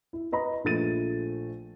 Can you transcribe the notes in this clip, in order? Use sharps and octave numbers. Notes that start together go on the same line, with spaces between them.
E4
B4 D#5 A#5 B5
A#1 F3 A3 A6 D#7